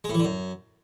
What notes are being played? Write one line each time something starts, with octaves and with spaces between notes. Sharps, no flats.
G#3
A2
E3
D3
F#2